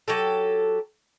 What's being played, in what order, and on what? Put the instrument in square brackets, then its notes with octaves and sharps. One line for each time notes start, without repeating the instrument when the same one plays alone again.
[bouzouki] F#3 G4 A4